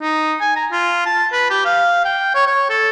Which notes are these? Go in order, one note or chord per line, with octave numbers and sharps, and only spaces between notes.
D#4
G#5
A#5
F4
A5
B4
G4
F5
G5
C#5
C#5
A4